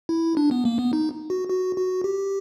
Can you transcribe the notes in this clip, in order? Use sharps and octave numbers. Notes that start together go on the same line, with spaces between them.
E4
D4
B3
A#3
B3
D#4
F#4
F#4
F#4
G4